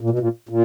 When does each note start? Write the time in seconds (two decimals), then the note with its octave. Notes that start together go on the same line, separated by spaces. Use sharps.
0.01 A#2
0.10 B2
0.19 A#2
0.49 A#2